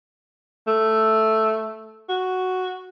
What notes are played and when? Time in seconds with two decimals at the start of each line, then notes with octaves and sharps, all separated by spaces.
0.67 A3
2.09 F#4